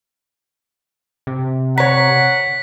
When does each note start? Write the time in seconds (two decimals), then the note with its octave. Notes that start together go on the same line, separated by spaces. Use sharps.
1.27 C3
1.78 C#5 F#5 A#5 B6